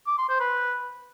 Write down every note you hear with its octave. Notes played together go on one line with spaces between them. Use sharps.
D6
C6
C5
B4